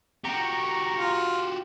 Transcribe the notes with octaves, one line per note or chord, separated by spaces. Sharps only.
F#4 G4 A#5 C#6
F4